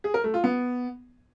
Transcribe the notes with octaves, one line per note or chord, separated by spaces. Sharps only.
G#4
A#4
A3
F4
B3